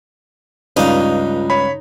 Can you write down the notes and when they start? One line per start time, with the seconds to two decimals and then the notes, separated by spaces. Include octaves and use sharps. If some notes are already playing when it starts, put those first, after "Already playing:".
0.77 C#2 G2 D#4 F4 F5
1.50 C#5 B5